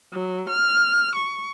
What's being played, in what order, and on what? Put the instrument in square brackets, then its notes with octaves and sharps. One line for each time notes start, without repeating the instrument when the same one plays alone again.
[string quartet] F#3
F6
C#6